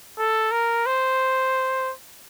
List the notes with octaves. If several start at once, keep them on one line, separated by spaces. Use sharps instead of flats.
A4
A#4
C5